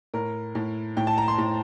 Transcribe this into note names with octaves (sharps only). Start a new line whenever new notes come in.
A2 A#4
A2
A2 G5
A5
A#5
C6
A2